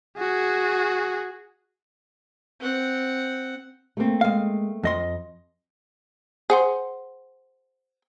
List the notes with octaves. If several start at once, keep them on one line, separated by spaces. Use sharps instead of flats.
F#4 G#4
C4 F#5
A3 A#3 C4
G#3 F5
F2 D#5 C6
G#4 C5 F#5 C6